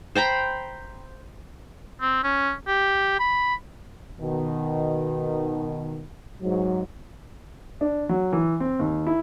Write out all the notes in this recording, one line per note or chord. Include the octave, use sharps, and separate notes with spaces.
C5 G5 A#5 B5
C4
C#4
G4
B5
B2 D#3
G#2 F#3
D4
F#3
E3
C4
D#2
E4